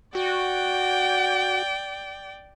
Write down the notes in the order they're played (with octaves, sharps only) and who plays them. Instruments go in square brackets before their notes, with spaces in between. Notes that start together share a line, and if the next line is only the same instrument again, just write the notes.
[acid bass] F#4 [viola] D5 G5